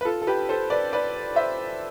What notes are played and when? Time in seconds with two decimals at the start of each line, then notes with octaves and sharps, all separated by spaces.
0.01 B4
0.05 F4 A4
0.22 A4
0.27 G4 B4
0.49 A4 C5
0.70 B4 D5
0.93 B4 D5
1.36 C5 E5